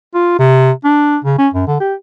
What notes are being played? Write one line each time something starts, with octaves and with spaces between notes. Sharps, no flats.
F4
C3
D4
C#3
C#4
F#2
D3
G4